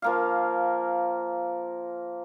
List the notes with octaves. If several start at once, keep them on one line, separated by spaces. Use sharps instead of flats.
F3 A#3 F5